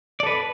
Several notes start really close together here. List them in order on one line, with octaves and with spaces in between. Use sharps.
D5 A4 B4